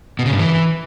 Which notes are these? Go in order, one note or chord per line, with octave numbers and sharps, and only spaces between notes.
B2
C#3
G2
E3